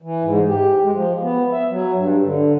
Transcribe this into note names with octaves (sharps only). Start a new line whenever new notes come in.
E3
G#2
G4
G#3
F3
B3
E5
F#3
G2
D3